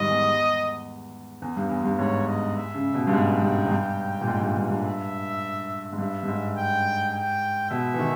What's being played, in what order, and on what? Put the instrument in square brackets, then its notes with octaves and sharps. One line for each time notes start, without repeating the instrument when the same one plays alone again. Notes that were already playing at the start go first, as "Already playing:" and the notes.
Already playing: [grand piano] G#2 D#3 G3 [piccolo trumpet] D#5
[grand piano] E2
E2
G2
E2
G2
[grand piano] G#2 [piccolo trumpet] C#5
[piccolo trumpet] D#5
E5
[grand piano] C#3
B2
G2
[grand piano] G#2 [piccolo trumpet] G5
[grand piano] G2
E2
G2
A#2
G#2
G2
G2
G2
[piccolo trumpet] E5
[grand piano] G#2
[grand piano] G2 [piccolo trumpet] E5
[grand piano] G2
G#2
[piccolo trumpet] G5
G5
[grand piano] B2 [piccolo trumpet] E5
[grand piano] E3
D#3